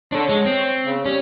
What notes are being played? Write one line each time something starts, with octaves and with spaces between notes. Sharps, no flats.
D4 A4 C#5
G#3
C4
C#3
G3 C#4